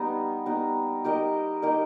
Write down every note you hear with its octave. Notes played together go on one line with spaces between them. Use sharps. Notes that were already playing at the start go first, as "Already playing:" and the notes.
Already playing: G3 B3 D#4 G4
G3 B3 D#4
D#4 G4 A#4 D#5
D#4 G4 A#4 D#5